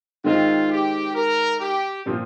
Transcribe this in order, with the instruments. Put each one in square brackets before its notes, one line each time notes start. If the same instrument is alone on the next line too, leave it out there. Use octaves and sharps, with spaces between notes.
[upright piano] D#3 G#3 C4 D#4 [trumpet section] F4
[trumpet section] G4
A#4
G4
[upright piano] A#2 F3 C4 F4